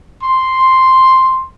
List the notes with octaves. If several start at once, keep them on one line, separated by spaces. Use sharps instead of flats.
C6